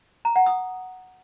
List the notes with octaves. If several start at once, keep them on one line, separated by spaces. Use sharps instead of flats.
A#5
F#5
D#6